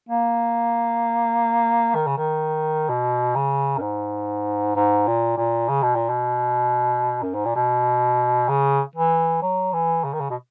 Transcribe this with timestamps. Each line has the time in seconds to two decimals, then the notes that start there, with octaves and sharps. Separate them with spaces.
0.09 A#3
1.95 D#3
2.07 C#3
2.17 D#3
2.89 B2
3.36 C#3
3.77 F#2
3.82 G#2
4.76 G#2
5.07 A#2
5.38 A#2
5.69 C#3
5.83 B2
5.96 A#2
6.09 B2
7.23 F#2
7.34 G#2
7.45 A#2
7.56 B2
8.49 C#3
8.96 E3
9.42 F#3
9.74 E3
10.04 C#3
10.14 D#3
10.20 C#3
10.31 B2